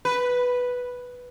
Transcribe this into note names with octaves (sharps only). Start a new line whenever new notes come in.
B4